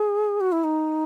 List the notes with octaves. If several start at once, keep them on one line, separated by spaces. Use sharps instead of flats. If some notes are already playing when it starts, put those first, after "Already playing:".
Already playing: G#4
F#4
E4
D#4